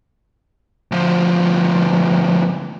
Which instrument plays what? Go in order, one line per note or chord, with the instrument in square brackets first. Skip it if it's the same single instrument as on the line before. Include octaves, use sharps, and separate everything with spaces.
[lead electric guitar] D2 F3